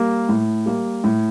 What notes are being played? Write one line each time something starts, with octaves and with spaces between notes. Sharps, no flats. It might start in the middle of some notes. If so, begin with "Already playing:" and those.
Already playing: G3 A#3
A2
G3 A#3
A2